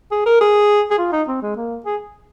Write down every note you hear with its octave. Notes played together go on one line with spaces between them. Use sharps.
G#4
A#4
G#4
G#4
F4
D#4
C4
G#3
A#3
G#4